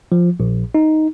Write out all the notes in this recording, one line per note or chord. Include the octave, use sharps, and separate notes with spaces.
F3
A#1
D#4